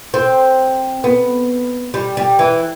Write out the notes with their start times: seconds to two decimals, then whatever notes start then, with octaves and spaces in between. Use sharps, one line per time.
0.14 C4
1.04 B3
1.94 G3
2.17 G3
2.39 E3